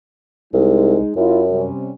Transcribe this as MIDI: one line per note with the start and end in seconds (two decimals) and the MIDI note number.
0.54 0.97 36
0.54 1.12 56
0.54 1.12 63
1.16 1.67 42
1.16 1.42 64
1.16 1.42 65
1.50 1.91 48
1.50 1.91 55
1.50 1.91 61